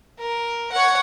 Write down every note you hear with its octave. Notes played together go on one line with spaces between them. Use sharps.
A#4
C#5 F#5